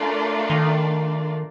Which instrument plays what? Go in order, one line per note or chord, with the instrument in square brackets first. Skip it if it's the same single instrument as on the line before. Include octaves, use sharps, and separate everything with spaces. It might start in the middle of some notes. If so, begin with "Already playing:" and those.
Already playing: [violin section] A3 D4 F4 A#4 D5
[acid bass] D#3